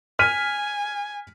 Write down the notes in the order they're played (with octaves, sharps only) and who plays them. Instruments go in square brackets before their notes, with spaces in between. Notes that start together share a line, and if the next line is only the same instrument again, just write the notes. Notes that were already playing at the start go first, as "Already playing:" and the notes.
[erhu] G#5 [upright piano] F6 B6 D#7